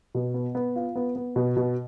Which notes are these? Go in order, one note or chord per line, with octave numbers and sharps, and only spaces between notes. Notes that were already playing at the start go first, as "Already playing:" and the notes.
B2
B3
B3
F4
B3
B3
B2
B2